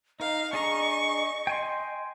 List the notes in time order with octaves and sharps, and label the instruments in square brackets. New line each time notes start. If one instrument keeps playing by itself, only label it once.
[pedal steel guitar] D#4 [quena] D#5 [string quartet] F5
[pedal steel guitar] D4 G#4 A#5 [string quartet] C#6
[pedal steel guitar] G5 G#5 C6